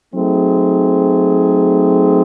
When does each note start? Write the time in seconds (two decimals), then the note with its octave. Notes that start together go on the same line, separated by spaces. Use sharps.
0.13 F#3 A3 C4 D#4 G#4